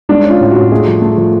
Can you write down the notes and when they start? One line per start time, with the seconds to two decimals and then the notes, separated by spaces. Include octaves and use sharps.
0.09 G#3 D4
0.24 C#4
0.30 F4
0.41 A2
0.51 F#4
0.56 A2
0.72 A3 G#4
0.87 F3
1.02 A3
1.17 F3